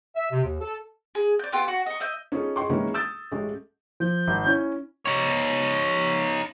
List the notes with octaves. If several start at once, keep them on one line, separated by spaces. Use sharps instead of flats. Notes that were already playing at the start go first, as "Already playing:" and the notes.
E5
C3
D#2
A4
G#4
D5 G6
B3 F4 G4 A4
F#4
D#5 C#6
D#5 E5 G6
C#4 D#4 F4 G#4 A4
G#4 D#5 G5 C6 C#6
D#3 E3 G#3 A#3 C#4
D#6 E6 G6 A6
A1 G#3 A3
F3 G6
G#1
C#4 E4
D#4 C#5